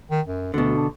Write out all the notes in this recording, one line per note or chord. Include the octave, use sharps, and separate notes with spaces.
D#3
F#2
D2 B2 D3
D4